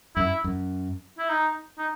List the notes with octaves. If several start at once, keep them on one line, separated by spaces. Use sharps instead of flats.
F#2 E4
F#2
E4
D#4
D#4